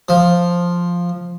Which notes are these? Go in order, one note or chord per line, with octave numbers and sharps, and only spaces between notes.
F3